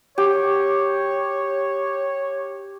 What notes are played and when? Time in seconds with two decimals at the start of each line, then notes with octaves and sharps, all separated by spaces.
0.18 G4 C#5